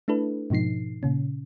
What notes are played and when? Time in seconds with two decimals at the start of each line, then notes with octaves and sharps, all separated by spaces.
0.08 A3 D4 E4 A4 B4
0.50 G#2 B2 F3 D#4 C7
1.03 A#2 C#3 C#4